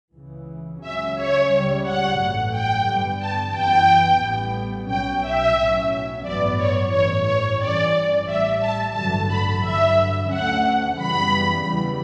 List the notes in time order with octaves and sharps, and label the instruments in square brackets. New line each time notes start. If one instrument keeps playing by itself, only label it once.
[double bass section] C#2 C#3 E3
[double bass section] C#2 C#3 F#3 C#4 [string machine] E5
[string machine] C#5
[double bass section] C#2 C#3 G3
[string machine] F#5
[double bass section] A1 G2 F#3 A3
[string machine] G5
[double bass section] G2 D3 G3 B3
[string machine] A5
[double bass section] F#2 E3 B3 [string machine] G5
[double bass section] A1 A2 G3 B3
[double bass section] B1 B2 F#3 C#4 [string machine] G5
[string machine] E5
[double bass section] B1 A2 F#3 C#4
[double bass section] A1 G2 F#3 B3 [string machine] D5
[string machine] C#5
[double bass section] A1 G2 E3 [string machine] C#5
[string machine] C#5
[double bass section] G2 E3 G3 C#4 [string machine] D5
[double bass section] A1 A2 G3 [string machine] E5
[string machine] A5
[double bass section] A1 G2 D3 F#3 [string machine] A5
[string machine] B5
[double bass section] G2 D3 F#3 [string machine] E5
[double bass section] D2 D3 A3 C#4 [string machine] F#5
[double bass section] F#2 C#3 E3 G3 B3 [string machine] B5
[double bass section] E2 C#3 E3 G3 B3